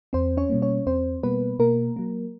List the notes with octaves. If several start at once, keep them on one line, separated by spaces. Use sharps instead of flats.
E2 C4 C5
C#4 C#5
B2 G3 A#3
C#4 C#5
E2 C4 C5
B2 G3 A#3 B3 B4
B2 A#3 A#4
F#3 A#3